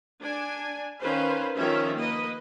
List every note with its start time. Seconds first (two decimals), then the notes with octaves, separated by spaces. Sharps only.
0.22 D4 G#5
1.01 D#3 C#4 B4 C5 F5
1.58 D#3 F3 C#4 F4 G4 E5
1.96 A#3 B4 D#5